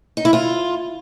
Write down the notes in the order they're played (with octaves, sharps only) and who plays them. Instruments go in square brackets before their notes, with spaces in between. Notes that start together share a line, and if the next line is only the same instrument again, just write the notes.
[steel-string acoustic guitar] D#4
E4
F4